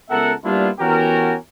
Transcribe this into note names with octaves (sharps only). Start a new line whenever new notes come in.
C#2 B3 A4 A#4 E5 F#5
G3 A#3 B3 D4 E4 F4
E3 B3 C#4 F#4 G4 A#4